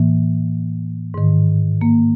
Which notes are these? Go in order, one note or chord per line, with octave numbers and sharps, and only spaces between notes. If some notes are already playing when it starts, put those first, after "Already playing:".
Already playing: A2 E3 A#3
G#2 D#3
A#3